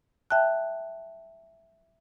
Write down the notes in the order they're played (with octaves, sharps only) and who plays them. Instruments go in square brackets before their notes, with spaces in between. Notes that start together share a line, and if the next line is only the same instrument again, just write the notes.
[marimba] E5 G5 A5 F#6